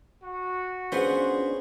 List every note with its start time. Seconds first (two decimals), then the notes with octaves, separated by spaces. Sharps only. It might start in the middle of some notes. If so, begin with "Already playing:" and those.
0.23 F#4
0.92 B3 C#4 D4 F4 G#4 C5 C6